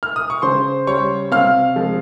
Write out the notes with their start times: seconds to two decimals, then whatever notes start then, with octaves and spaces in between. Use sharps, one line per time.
0.03 F6
0.16 D#6
0.30 C#6
0.42 C#3 C5 C6
0.87 G3 C#5 C#6
1.32 C3 F5 F6
1.76 F3 G#3